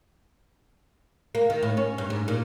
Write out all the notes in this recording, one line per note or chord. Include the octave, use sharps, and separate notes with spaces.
A#3
D#3
A2
C#4
G2
G#2
A#2